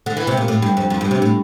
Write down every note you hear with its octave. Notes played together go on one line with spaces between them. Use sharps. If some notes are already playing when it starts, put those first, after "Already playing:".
D3
E3
C3
A#2
A2
G2
F2
F2
G2
C3
A2